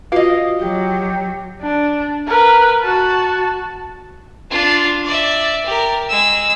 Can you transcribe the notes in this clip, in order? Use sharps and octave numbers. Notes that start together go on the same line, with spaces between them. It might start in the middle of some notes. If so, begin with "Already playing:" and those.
F4 F#4 B4 D#5 F5
F#3 G4
D4
A#4 B4
F#4 A5
D4 F4
D5 E5
G4 A#4
G#3 E6